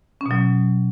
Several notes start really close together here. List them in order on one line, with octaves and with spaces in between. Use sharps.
C#4 B2 F#3